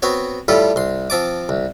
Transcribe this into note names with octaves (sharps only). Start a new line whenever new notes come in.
B3 C4 F#4 C#5
A2 G3 F4 G4 A4
C2 C6
F3 C4 A5 D6
C2